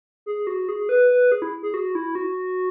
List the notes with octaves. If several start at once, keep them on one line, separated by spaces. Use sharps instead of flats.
G#4
F#4
G#4
B4
B4
G#4
E4
G#4
F#4
E4
F#4